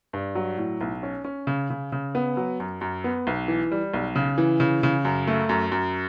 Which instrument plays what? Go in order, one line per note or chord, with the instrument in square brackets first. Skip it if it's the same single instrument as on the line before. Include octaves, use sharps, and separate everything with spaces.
[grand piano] G2
F#3
A2
B1
C#4
C#4
C#3
C#3
C#3
B3
F#3
F#2
F#2
B3
B1
E3
G3
B1
C#3
E3
C#3
C#3
F#2
A3
F#2
F#2